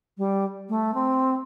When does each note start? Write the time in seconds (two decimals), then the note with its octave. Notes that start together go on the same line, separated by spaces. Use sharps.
0.17 G3
0.69 A3
0.94 C4